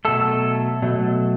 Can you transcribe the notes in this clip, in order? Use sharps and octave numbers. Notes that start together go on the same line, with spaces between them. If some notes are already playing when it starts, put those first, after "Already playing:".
B2 F#3 A3 A4
B2 F#3 A3